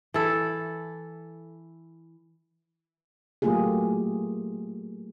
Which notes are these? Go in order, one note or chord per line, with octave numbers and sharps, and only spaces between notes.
E3 A4
F#3 A3 A#3 F4 G4 G#4